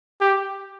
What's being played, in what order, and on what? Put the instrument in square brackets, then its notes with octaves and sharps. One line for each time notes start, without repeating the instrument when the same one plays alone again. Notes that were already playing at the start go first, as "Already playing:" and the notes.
[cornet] G4